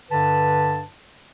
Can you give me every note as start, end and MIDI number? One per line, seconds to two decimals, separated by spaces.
0.11 0.83 43
0.11 0.83 50
0.11 0.83 71
0.11 0.83 81